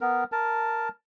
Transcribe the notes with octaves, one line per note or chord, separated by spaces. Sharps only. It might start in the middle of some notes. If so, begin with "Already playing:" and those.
B3 A#4
A#4 A5